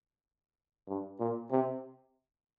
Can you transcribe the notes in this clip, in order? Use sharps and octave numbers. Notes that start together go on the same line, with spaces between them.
G2
A#2
C3